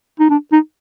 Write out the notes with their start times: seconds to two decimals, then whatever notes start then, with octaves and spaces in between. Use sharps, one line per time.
0.20 D#4
0.30 D4
0.52 D#4